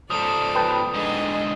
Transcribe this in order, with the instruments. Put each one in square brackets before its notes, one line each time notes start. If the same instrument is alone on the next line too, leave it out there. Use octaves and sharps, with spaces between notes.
[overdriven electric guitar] G#2 F3 [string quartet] A4 D5 [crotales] D#6
[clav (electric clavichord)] B4 G5 A5
[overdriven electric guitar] G#2 D3 [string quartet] G#4 D#5